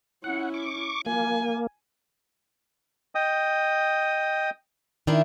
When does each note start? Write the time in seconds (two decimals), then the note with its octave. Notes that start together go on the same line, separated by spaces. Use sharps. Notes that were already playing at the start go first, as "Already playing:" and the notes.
0.24 C#4 E4 F#5
0.54 C#6 D6
1.06 A#3 G#5
3.15 D#5 G5 D#6
5.07 D#3 D4 E4